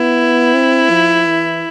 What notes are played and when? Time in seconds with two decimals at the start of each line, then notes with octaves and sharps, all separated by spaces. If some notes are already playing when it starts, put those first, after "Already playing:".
Already playing: B3 E4
0.54 C4
0.90 F3
1.26 E3